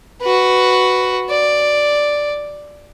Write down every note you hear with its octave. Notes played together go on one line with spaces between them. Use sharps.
F#4 B4
D5